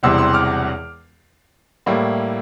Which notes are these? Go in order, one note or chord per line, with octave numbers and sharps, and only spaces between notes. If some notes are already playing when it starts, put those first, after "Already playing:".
E1 E2 C3 E3 G3 C6 E6
C6 E6
D6 F6
A2 G3 A#3 E4